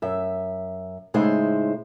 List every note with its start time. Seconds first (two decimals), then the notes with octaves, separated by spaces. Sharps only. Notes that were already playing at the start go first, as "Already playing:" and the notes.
0.02 F#2 E5
1.14 A2 C#3 G#3 D#4 C5 E5